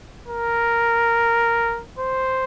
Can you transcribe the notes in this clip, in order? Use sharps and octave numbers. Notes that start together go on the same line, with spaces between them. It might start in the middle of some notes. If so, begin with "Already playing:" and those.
A#4
C5